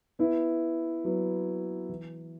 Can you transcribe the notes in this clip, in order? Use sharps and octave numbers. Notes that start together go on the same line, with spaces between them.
B3 E4
F#3 B3
E3